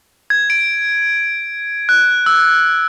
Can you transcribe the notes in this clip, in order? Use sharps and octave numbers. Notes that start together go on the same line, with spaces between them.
G#6
D7
F#6
E6